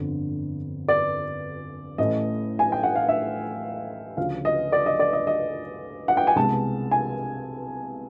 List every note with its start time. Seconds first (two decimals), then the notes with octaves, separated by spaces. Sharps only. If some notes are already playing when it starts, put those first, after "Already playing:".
Already playing: G1 F2 D3
0.88 D5
1.98 A1 A2 E3 A3 D#5
2.59 G#5
2.72 G5
2.83 F#5
2.96 F5
3.09 E5
4.17 D2 C#3 F3 F5
4.45 D#5
4.72 D5
4.86 D#5
4.99 D5
5.13 D#5
5.27 D#5
6.08 F#5
6.17 G5
6.27 G#5
6.36 C2 B2 G#3 A5
6.91 G#5